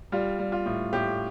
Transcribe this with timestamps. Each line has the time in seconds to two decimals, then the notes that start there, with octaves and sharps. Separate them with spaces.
0.12 G3 F4
0.39 G3
0.52 F4
0.66 A2
0.93 A2 G4